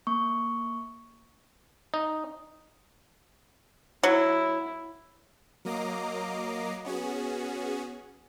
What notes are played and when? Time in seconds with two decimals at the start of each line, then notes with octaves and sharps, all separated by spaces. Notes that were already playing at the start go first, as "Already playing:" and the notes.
0.07 A#3 C#6
1.94 D#4
4.03 F#3 E4
5.65 F#3 A#3 D#5 A#5 D6 C7
6.85 B3 C#4 F#4 G#4